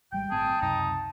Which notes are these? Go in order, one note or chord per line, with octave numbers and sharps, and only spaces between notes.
G#1 G3 G#3 G5
G1 A2 C4 G#4 A5
C#2 F#2 C3 D#4